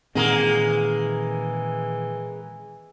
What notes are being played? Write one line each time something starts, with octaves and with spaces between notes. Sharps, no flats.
A#2 D#3 E3 G#3 A#3 C4